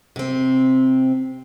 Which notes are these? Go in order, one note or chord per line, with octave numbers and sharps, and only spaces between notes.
C3 C4